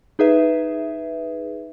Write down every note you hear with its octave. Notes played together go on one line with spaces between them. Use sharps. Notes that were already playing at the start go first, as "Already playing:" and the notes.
D#4 G#4 B4 E5